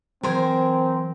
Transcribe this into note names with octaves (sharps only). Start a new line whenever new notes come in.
E3 F#3 C4 A#4 C5 G#5